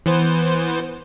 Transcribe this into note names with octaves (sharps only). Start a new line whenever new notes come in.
E3 B3 C5